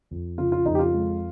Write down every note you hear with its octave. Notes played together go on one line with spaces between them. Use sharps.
F2
C#3 F4
F4
F2 D#4
G4
F4
G#3